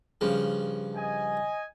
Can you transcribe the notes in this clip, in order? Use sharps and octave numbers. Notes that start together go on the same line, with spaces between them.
G2 C#3 F3
D#5 G#5